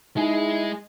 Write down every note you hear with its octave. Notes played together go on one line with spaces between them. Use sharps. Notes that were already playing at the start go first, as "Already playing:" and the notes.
G#3 D#4 E4 G#4